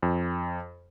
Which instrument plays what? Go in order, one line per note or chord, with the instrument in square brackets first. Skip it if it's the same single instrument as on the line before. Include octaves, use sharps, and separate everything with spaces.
[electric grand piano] F2